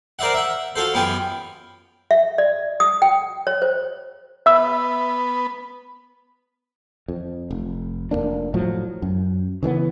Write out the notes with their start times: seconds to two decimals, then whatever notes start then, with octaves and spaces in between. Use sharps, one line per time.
0.19 A#4 C5 D5 E5 F#5
0.34 E5 F#5
0.76 F4 F#4 A4 C5
0.94 F#2 B3 F4 G4 G#5
2.11 E5
2.38 D5
2.80 D#6
3.02 G5
3.47 C#5
3.62 C5
4.46 B3 E5 E6
7.08 F2
7.51 F1
8.11 F1 F#2 A#3 D4
8.54 A2 F3 F#3
9.02 F#2
9.63 C#3 E3 G#3 B3